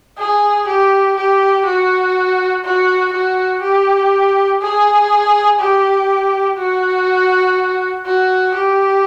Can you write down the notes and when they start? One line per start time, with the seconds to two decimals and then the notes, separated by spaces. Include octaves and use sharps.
0.18 G#4
0.67 G4
1.17 G4
1.65 F#4
2.64 F#4
3.13 F#4
3.62 G4
4.61 G#4
5.59 G4
6.58 F#4
8.05 F#4
8.54 G4